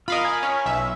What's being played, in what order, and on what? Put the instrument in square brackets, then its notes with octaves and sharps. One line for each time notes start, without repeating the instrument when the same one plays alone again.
[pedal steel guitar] F4 D#5 [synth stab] A#4 F5 B5
[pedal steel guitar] G#5
[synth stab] C#4
B1 E5